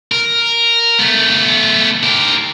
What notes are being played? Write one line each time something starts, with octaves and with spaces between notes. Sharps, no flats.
A#4
A3 B3
G4 A#4